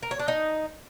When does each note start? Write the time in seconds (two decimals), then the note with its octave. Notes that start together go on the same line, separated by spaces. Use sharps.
0.02 A#4
0.11 C#5
0.19 D4
0.28 D#4